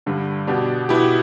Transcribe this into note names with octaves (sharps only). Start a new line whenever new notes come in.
G2 D3 G3
B2 B3 D4 G4
B2 B3 E4 G4